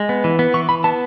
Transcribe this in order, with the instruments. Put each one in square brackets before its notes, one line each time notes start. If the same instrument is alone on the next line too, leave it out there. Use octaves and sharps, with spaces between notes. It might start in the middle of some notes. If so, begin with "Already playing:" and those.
Already playing: [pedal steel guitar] G#3
B3
E3
B3
E3 C#6
E3 B5
B3 A5